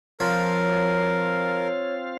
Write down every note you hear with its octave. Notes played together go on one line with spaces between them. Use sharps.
F3 C4 F4 A#4 C#5 F5